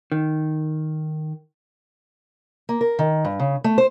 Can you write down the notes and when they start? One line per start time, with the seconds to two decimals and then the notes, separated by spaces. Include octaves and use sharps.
0.12 D#3
2.69 A#3
2.81 A#4
2.99 D#3
3.25 G2
3.40 C#3
3.64 A3
3.78 C5